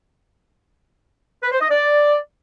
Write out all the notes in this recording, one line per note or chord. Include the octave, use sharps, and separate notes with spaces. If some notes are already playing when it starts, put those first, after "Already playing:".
B4
C5
D#5
D5